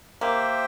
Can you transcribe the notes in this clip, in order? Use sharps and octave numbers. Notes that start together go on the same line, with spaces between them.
A#3 G4 C5 E5 G5